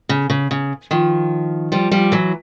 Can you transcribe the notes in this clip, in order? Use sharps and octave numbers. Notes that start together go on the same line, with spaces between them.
C#3
C#3
C#3
D#3 F3
F3 G3
F3 G3
E3 F#3